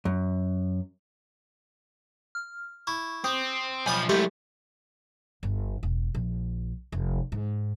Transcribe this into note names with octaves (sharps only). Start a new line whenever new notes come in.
F#2
F6
E4 C#6
C4 G4 D#6
B1 F3 G3 G#5 B5 D#6
C2 F#3 G#3 A3 C4 G4 F5
G1
E1
A#1
F1
G#2